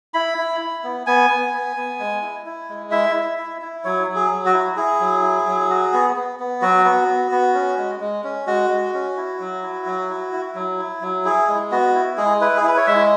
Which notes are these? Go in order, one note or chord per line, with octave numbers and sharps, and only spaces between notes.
E4 B5
E4
E4
B3
B3 G#5
B3
B3
B3
G#3
E4
E4
G#3
E4 E5
E4
E4
E4
F#3 C#5
F#3
G#4
F#3
F#4
E4
E4 G#4
F#3
E4
F#3
F#4
B3
B3
B3
F#3 F#4
B3
B3
B3
C#4
G#3
G#3
C#4
G#3 F#4
G#3
C#4
E4
F#3
E4
F#3
E4
E4
F#3
E4
F#3
E4 G#4
G#3
B3 F#4
E4
G#3 G#4
E4 B4
G#4
E4 B4
C#5
G#3 E5